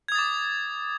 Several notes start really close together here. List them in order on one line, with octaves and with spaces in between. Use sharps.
G#6 D#6 A6 D6